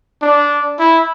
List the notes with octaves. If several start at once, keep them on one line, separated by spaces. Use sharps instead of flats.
D4
E4